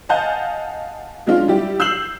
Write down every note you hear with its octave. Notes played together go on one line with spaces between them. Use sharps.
D#5 F5 F#5 G#5 A5 G6
F#3 G#3 C#4 D4 F4 F#4
G3 E4 G4
E6 G6 C7 E7 F#7